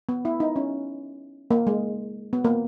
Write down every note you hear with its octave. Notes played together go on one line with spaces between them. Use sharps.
B3
E4
D#4
C#4
A#3
G#3
B3
A#3